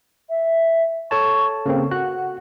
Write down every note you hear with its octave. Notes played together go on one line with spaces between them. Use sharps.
E5
A4 C#5 A5 C#6
C#3 A#3 C4 A4
F#4 F#5 F#6